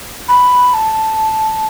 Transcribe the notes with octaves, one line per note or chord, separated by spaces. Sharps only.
B5
A5